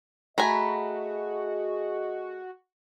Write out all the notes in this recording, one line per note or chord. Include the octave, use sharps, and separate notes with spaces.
A3 F#4 G#4 D#5 G#5 A#5 B5